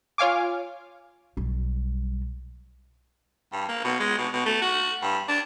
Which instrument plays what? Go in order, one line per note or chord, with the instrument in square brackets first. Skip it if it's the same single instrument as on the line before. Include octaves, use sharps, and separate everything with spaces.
[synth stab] F4 C#5 F5 G#5 D6
[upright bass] B1 G3
[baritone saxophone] G2
A#3
B2
G#3
B2
B2
A3
F#4
G2
D4